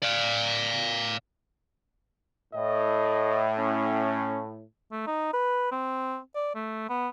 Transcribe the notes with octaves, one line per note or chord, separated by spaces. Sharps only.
D5 F5
A2 D#5
C#4
A3
D#4
B4
C4
D5
A3
B3